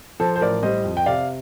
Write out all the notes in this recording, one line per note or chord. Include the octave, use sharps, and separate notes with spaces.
F3 A4 C5
C5
A1 A#4 D5
G3 C5 D#5
F2
G5
C3 D5 F5